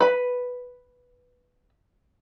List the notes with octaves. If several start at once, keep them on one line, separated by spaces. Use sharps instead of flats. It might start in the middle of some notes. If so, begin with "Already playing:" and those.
B4 B5